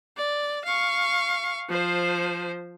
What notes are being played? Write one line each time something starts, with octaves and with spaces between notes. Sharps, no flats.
D5
F5 C#6
F3 C5